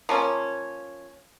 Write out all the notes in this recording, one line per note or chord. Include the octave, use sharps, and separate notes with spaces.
F3 A#3 C#4